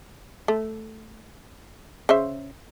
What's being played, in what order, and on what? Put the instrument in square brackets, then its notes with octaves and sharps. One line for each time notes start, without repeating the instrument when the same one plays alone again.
[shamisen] A3
C#3 C5 E5